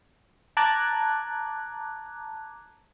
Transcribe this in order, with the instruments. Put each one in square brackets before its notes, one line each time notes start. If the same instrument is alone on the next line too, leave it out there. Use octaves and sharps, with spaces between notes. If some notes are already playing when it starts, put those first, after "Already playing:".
[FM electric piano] A5 A#5 D6 F#6 G#6